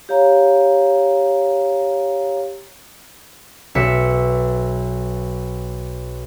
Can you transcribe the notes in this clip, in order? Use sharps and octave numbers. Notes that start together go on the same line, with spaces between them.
G4 C#5 F5 A#5
B1 E5 C#7